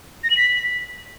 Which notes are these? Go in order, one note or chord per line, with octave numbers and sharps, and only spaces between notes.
A#6
F#7
B6